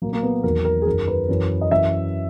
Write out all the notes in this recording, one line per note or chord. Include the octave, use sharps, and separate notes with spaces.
A#2 F#3 A#3
A#3
B3
E2 D#3 F#3 A#4
A#4
G#4
F#2 D#3 F#3 A#4
B4
F#2 E3
D#5
F#2 E3 E5